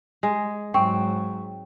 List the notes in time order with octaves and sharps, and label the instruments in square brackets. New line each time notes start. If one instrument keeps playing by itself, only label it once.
[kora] G#3
[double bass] G#2 F#3 [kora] C4 [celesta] G5 C#6